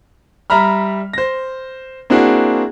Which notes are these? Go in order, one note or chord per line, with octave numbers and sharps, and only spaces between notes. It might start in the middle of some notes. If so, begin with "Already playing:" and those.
G3 E5 A#5 B5 F6
C5 A#6
A#3 C4 D4 E4 F#4 G#4